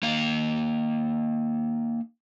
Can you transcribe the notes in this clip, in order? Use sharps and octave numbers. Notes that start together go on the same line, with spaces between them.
A#3 D#4 F5